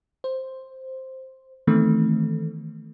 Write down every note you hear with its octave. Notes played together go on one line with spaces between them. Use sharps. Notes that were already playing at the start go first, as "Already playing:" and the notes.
C5
D#3 E3 A3 B3 C4